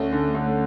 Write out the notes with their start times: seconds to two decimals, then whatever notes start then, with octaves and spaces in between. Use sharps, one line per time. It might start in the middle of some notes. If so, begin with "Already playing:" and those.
Already playing: D2 A3 C#4
0.13 D3
0.35 D2